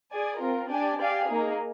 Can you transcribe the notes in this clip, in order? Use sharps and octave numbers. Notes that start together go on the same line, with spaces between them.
G#4 D5 G#5
C4 F4 A#4
D4 G4 D5 G#5
G4 D5 F5 G#5
A#3 D#4 G#4